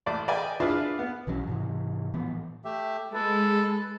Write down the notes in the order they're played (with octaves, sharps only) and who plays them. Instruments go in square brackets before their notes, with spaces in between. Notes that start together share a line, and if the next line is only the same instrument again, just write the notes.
[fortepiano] A1 D5 D6
B4 D5 D#5 G5 G#5
D4 E4 F4 G#4 B4 D5
B3
[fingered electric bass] B1 E3 F#3 C#4
G#2 C3 E3
A2 E3 F3 B3
[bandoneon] A3 G4 E5
[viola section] G#3 [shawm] A4 [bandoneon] B4